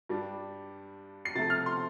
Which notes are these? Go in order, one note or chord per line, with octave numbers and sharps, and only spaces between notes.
G2 G3 D4
C7
C3 F3 A3 A6
F6
C6